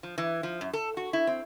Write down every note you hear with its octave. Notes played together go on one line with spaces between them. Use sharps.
F3
E3
F3
F#2
A4
F#4
E4
C4